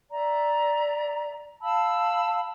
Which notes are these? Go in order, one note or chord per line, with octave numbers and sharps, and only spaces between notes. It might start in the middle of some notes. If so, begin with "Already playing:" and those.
D5 E5 A#5
F5 A5 B5 E6